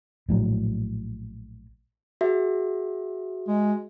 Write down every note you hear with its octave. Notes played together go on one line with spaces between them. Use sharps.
A#1 A2 F#3
F#4 G#4 E5
G#3